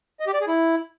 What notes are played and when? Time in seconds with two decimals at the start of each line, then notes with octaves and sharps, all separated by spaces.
0.20 D#5
0.27 G4
0.34 D5
0.41 G#4
0.48 E4